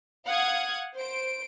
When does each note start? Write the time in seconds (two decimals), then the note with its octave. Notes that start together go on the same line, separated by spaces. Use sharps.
0.25 F5 F#5 D#6 G#6
0.96 C5 D7